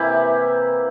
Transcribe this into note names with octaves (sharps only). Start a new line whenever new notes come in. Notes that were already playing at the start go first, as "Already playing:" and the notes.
Already playing: C3 E3 A#3 E4 G4